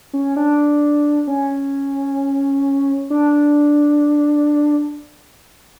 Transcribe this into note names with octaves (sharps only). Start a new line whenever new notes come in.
C#4
D4
C#4
D4